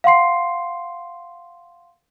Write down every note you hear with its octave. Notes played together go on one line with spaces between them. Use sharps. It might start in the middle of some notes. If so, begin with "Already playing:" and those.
F5 F#5 C6 C7